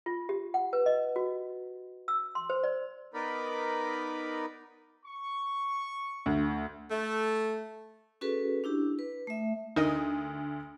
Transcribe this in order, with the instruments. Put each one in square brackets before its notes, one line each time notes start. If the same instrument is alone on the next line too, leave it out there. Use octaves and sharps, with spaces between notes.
[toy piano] F4
G4
F#5
B4
D#5
F#4
E6
C6
C5
D5
[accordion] B3 D#4 A#4 D5 B5
[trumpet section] C#6
[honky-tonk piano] D2
[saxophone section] A3
[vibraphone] C#4 F#4 G#4 A4 B4
D4 E4 G4
B4
A3 E5
[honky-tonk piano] D2 D#6 [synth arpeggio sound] D#4 A#4 D#5